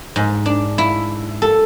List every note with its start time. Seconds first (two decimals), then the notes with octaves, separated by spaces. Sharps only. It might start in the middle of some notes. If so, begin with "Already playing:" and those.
0.16 G#2
0.46 D4
0.78 E4
1.42 A4